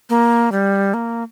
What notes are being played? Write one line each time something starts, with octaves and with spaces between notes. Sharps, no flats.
A#3
G3
A#3